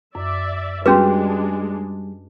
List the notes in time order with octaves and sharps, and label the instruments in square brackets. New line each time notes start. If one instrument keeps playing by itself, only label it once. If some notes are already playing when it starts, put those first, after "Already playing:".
[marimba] F#2 [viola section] D5 E5
[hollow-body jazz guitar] G3 [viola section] G#3 D4 [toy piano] C#4 G#4 B4 [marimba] F#4 C6